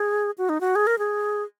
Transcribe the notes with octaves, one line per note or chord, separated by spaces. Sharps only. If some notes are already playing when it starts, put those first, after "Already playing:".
Already playing: G#4
F#4
D#4
F#4
G#4
A#4
G#4